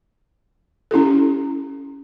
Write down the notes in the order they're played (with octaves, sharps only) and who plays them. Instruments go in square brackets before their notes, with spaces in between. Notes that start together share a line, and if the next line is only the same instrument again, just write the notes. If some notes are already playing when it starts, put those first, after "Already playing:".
[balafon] C#4 E4 G4 A4